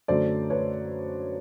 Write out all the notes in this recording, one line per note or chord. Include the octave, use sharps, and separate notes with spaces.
F#2 D3 F#3 A3 C5 D5
B4 C#5